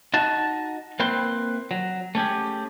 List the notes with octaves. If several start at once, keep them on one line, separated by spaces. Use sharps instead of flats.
D#4 F#4 A5
A#3 C4 E4 B4 G5 C6
F#3
A3 C#4 G4 G#4